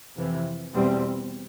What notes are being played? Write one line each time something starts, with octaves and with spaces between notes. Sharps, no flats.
F2 C3 E3
E2 B2 G3 C4